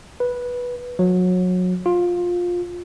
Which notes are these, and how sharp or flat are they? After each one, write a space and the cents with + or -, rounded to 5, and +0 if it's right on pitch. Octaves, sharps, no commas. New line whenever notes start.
B4 -10
F#3 -25
F4 +15